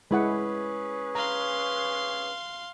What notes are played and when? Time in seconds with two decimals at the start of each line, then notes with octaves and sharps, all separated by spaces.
0.11 G#3 C#4 E4 G#4 B4 F#5
1.15 F5 A#5 C6